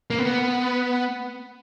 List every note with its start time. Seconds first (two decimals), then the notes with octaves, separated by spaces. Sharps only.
0.10 A#3
0.19 B3